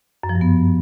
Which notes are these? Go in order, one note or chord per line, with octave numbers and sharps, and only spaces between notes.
F#2
F3
G2
B3